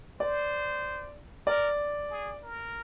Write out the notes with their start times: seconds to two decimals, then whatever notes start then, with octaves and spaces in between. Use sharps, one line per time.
0.20 C5 D5
1.47 A#4 D5
2.10 G#4
2.43 A#4